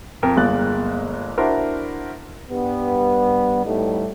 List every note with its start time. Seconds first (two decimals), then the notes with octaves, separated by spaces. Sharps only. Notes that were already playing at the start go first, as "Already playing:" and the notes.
0.23 F2 A#4
0.36 G1 G#3 A#3 F#6 A6
1.38 D4 E4 F#4 A#4 C5
2.49 G2 G3 B3
3.64 A2 G3 A3 D#4